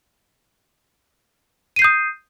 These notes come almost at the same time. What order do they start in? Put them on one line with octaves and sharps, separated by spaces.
D#7 C7 G6 D#6